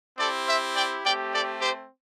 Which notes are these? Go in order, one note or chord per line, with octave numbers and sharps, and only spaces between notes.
C4 E4 G4 A4 D5
C5 E5
D5 G5
A3 C4 G4 D5 G5
A4 D5
G4 C5